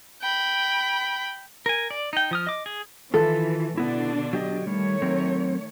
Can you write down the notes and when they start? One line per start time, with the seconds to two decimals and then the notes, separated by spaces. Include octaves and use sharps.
0.22 G5 B5
1.66 A#4 G#5
1.91 D5
2.13 D#4 G5
2.31 F3 D#6 F6
2.47 D#5 D6
2.66 G#4
3.14 D#3 E3 E4 F4 A4
3.77 B2 D3 B3 D4 E4
4.33 F#3 G4 D#5
4.67 D#3 G3 A3 C#5
5.02 F#3 C4 A#4